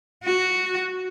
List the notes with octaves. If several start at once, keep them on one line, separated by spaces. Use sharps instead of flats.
F#4